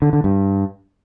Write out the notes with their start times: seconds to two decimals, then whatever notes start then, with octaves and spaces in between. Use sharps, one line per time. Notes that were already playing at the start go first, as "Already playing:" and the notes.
0.02 D3
0.13 D3
0.24 G2